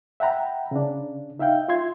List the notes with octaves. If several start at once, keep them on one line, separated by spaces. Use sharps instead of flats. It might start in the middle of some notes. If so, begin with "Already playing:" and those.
E5 F#5 G5 A#5 B5
C#3 D4
D#4 E5 F5 G5 G6
F4 E5 C6 G#6